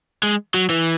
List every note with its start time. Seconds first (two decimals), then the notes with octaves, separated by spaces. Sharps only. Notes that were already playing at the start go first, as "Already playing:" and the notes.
0.23 G#3
0.54 F#3
0.69 E3